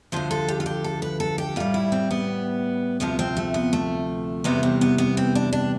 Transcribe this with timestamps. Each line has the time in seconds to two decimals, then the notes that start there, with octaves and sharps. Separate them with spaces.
0.12 D2 D3 F3 C5
0.31 A4
0.48 G4
0.60 F4
0.66 G4
0.84 A4
1.02 B4
1.20 A4
1.38 G4
1.56 A2 G3 F4
1.74 E4
1.92 C4
2.11 B3
3.00 D2 C3 F3 B3
3.19 C4
3.37 A3
3.54 B3
3.73 A3
4.44 E2 C3 E3 G3 B3
4.63 C4
4.81 B3
4.98 B3
5.17 C4
5.35 D4
5.53 D4